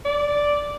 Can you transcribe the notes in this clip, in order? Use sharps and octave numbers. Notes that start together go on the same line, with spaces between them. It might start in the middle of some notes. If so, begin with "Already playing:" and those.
D5